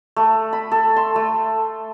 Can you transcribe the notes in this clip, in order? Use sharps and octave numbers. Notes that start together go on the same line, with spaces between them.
A3
B5
A4
C6
A3